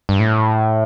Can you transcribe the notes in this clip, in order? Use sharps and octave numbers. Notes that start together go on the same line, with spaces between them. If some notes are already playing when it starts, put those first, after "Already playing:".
G2
A2